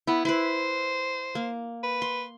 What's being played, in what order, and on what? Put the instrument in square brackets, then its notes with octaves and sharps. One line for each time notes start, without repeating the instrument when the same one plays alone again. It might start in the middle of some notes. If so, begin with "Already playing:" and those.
[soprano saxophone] B3 [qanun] E4
[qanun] E4 B4 [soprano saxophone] C5
[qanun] A#3
[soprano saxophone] B4
[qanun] C6